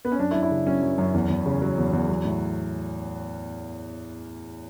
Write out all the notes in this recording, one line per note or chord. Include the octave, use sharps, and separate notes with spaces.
B3
C#4
F#2 D4
E4
F#2
E4
C#3
F#3 C#4
F#2
F#2
E2
E2
C#3
F#3
E2
E2
F#3
A2